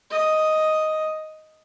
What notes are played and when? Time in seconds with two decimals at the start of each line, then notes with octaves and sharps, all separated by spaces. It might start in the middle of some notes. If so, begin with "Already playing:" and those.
0.10 D#5